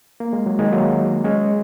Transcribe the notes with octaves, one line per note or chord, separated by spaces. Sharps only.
A#3
G#3
F#3
D#3 G#3
F#3 A#3
G#3 C#4